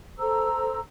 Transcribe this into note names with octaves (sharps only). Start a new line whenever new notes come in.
A4 C5 A#5 E6